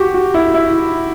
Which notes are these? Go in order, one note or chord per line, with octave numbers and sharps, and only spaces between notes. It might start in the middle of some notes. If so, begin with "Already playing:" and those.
Already playing: F#4 G4
F#4
E4
E4